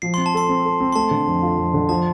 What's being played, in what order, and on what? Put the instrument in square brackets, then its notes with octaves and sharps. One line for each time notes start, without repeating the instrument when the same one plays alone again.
[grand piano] F3 [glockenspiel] C7
[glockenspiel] C6
[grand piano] C4
[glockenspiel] A5
[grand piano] A4 [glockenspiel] C6
[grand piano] C4
A4
C4
[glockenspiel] C6
[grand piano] A3 [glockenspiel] A5
[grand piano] D3
F2
F4
F2
D3
[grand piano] F3 [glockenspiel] A5